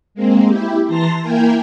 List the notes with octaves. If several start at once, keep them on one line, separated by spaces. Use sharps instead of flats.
G#3 A#3 C4
E4 G4
E3 A5 A#5 C6 A#6
A#3 E4 A#4 G5 G#5